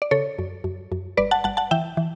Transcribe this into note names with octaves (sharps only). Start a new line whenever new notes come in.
D5
C#3 A4 C#5
F#2
F#2
F#2
G1 B4 D5
F#5 A5
G1 F#5 A5
F#5 A5
E3 E5 G5
E3